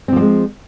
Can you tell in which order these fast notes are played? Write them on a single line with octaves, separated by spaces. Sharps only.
C4 F3 A#3 G#3